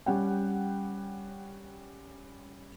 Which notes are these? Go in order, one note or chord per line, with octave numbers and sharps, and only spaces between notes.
G3 C#4 F#5 G5